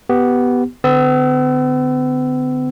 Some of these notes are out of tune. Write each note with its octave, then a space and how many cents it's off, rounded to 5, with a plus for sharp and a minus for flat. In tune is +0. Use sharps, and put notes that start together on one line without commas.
B3 +0 G4 -10
D3 +0 B3 +45 E6 +0